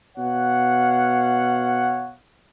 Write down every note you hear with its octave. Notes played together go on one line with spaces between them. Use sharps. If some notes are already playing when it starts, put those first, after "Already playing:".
B2 C#5 F5 F#5